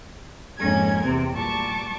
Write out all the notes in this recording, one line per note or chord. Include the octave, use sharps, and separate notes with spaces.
F2 G#2 A#3 C#4 A4 G#6
E2 C3 C4
A#2 G3 A5 C#6 D6